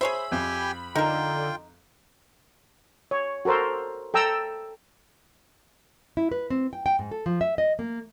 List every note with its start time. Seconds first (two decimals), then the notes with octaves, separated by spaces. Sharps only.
0.01 G#4 C5 C#5 E5 B5
0.32 F2 G4 G5 G#5
0.95 D3 D#4 F4 A#4 G5
3.11 C#5
3.45 F#4 A4 A#4 C5
4.14 A4 G5 A#5 E6
6.17 E4
6.32 B4
6.50 C4
6.73 G5
6.86 G5
6.99 G#2
7.11 A4
7.26 F3
7.41 E5
7.58 D#5
7.79 A#3